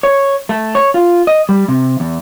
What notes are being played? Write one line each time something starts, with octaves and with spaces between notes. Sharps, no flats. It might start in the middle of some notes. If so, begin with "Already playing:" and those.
C#5
A3
C#5
F4
D#5
G3
C3
E2